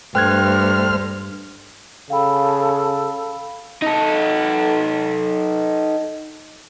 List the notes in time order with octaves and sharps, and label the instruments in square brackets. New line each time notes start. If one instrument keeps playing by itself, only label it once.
[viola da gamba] G2 [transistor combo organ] A3 C5 F6 [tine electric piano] G5 F#6 G#6
[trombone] C#3 [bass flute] A4 [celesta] F5 G5 B5
[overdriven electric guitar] D#4 A4